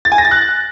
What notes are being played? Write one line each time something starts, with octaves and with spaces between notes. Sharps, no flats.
A6
G#5
A#6
A6
F#6